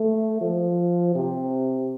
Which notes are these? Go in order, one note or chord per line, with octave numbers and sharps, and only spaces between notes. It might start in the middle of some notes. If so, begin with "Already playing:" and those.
Already playing: A3
F3
C3